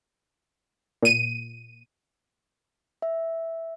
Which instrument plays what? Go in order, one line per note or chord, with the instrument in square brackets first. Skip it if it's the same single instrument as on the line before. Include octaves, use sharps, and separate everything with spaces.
[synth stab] A#2 D#7
[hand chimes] E5